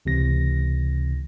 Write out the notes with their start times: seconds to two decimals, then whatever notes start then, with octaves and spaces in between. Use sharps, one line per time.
0.05 C#2 C3 E3 A#6